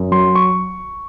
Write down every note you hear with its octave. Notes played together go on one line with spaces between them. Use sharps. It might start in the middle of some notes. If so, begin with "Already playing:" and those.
Already playing: F#2
F#3 C6
C#6